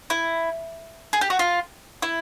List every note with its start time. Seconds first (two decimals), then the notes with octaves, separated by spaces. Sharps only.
0.10 E4
1.13 G#4
1.21 G4
1.30 F#4
1.39 F4
2.02 E4